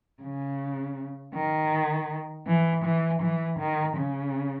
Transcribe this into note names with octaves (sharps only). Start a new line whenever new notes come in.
C#3
D#3
E3
E3
E3
D#3
C#3